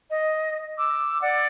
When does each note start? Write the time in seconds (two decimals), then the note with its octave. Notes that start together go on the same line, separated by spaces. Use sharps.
0.10 D#5
0.77 D6 E6
1.22 D5 F#5